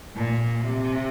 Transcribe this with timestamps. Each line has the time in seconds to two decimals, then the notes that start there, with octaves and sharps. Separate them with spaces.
0.16 A#2
0.61 C3